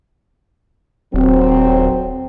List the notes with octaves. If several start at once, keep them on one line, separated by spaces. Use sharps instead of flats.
D#1 F#3 C4